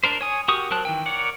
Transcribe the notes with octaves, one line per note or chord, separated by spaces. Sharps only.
D4 A#4 C5
C#5 G#5 D#6
F#4 G4 A#4 C#6 D#6
F#3 A#4 C5 A5 F#6
D#3 E3 G5
A#4 C#5 D5 F#5